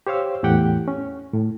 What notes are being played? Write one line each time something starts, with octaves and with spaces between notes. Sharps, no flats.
G4 C5 C#5 F5 E6
E2 A2 G4 F#5 G5
C#4
A2